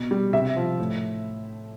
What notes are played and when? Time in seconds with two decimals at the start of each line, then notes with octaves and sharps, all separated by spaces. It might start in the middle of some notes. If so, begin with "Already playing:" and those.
Already playing: B2
0.11 G3
0.33 C3 E5
0.57 F3
0.79 A2